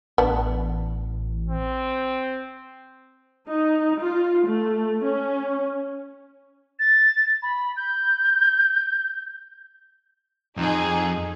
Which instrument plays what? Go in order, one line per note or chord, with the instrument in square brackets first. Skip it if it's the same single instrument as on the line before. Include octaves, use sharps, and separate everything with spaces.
[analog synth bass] A1 [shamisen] B3 D4
[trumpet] C4
[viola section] D#4
F4
A3
C#4
[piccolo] A6
B5
G6
[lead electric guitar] F2 [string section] D#4 G#4